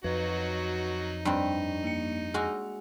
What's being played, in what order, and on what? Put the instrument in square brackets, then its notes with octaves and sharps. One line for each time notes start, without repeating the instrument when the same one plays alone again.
[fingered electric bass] F2 [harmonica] F#3 D#4 F#4 [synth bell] B4
[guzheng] G2 C4 [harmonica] D#4 [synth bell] D5 C#6
[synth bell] A#3 C#7
[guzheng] G#3 F#4 [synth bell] G#4 G#5 E6